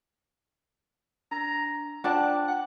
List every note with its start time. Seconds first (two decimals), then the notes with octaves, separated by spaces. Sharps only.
1.31 D4 A#5
2.04 D4 F4 C5 D5 F#5 G5 A5
2.48 F#5